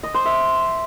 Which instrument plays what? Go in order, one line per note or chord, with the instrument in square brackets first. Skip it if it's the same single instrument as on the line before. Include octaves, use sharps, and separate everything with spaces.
[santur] D#5
C5
E5